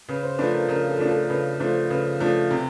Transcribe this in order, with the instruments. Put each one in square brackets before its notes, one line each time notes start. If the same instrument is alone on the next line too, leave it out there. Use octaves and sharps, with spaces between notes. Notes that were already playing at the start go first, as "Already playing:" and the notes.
[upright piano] C#3 [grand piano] B4
[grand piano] C5
[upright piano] F3 A3 D4 [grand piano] B4
[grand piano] A#4
[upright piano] C#3 [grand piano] A#4
[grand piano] A4
[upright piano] F3 A3 D4
[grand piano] A4
A#4
[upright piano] C#3 [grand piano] B4
[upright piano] F3 A3 D4 [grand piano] C5
[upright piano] C#3 [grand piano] B4
[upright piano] F3 A3 D4
C3